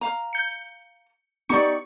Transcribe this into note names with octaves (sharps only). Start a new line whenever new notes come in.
F5 A#5
G6 C#7
B3 D#4 G4 D5 C#6 C#7